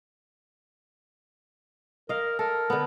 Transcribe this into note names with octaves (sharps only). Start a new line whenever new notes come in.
A#4 D#5 F5
A4 A#4
D3 B3